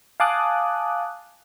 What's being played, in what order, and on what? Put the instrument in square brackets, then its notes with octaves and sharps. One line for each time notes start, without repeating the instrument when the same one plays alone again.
[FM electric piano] F5 G#5 A5 D6 D#6 F#6